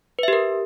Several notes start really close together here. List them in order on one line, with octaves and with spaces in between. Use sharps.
B4 E5 G4 A#4